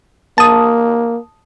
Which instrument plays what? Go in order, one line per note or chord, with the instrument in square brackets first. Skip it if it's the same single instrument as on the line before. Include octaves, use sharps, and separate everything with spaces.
[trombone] A#3 [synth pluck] A5 D#6